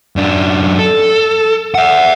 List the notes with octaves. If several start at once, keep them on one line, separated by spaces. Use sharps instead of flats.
F#2 D4
A4
E5 F#5